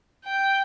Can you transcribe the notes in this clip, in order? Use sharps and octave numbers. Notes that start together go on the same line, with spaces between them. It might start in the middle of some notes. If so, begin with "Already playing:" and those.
G5